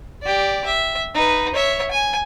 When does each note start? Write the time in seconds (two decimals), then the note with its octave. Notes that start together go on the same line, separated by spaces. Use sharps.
0.22 G4 D5
0.66 E5
1.14 D#4 B4
1.54 C#5 E5
1.91 G#5